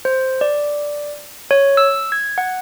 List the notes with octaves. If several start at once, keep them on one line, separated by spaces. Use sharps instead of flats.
C5
D5
C#5
E6
G#6
F#5